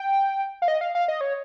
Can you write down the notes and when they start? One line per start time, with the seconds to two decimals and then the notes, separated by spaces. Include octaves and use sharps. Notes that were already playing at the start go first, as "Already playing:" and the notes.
Already playing: G5
0.62 F5
0.68 D#5
0.81 F5
0.95 F5
1.08 D#5
1.21 C#5